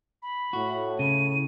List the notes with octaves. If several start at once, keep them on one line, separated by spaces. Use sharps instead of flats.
B5
A2 F#4
C#3 D#7